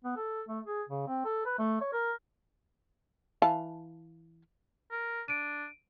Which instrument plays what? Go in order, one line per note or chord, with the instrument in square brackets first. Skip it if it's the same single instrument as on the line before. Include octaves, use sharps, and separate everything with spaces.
[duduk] B3
A4
A3
G#4
C#3
C4
A4
B4
A3
C#5
A#4
[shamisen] E3 F5 A5
[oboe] A#4
[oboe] D4 [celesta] D7 D#7